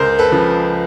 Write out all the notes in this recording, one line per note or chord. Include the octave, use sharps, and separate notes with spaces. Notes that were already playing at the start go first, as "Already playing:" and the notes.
Already playing: C#2 A#4 C5
A4 B4
C#3 F3